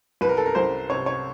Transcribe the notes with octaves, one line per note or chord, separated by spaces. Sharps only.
C2 B4
A#4
A4
A#4
C2 C5
C3 C#5
C#5